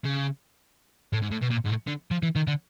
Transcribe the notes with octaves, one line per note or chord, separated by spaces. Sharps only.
C#3
A2
G#2
A2
B2
A#2
G#2
A2
D3
F3
E3
D#3
D3